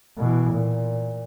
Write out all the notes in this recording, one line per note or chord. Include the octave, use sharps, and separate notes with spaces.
B2 E3
A#2